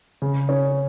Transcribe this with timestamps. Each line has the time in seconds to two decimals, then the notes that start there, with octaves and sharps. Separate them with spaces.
0.22 C#3
0.49 C#4